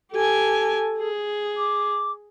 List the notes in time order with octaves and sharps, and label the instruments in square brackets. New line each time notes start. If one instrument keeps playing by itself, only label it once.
[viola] G4 G#5 [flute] A4
[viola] G#4
[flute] D6